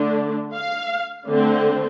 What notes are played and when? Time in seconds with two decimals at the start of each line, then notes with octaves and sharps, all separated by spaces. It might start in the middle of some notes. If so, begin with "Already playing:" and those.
Already playing: D3 A3 D4
0.53 F5
1.29 D3 A3 C4